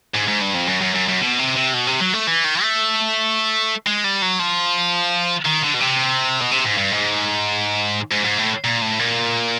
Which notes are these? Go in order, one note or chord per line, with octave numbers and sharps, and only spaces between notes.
G#2
G#2
G2
F2
F#2
F#2
F#2
F#2
B2
C3
C3
B2
C3
F#3
A3
E3
D#3
A3
G#3
G3
F#3
F3
D#3
D3
B2
C3
B2
C3
G#2
G2
G#2
G#2
G#2
A2
A#2
A2
A#2